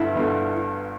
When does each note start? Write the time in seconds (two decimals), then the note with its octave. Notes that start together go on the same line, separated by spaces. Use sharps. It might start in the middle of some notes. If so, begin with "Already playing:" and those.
Already playing: G1 G2 D3 A3 E4
0.15 G1 G2 D3 A3